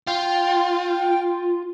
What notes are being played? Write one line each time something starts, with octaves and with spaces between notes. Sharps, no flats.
F4 G5